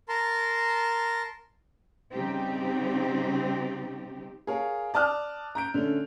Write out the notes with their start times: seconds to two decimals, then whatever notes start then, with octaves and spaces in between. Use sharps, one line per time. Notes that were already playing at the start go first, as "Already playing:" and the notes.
0.09 A#4 A5 A#5 C6
2.13 C#3 G3 C4 D#4 G4
4.47 G#4 A#4 C#5 F5
4.94 D5 A5 D#6 F6 F#6
5.55 A#5 G6 D7
5.74 D3 A3 C#4